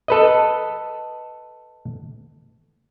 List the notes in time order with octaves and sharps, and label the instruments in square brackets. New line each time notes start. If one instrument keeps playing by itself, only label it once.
[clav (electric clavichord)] A4 B4 D#5